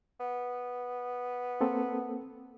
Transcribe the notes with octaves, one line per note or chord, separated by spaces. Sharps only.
B3
A#3 C4 A4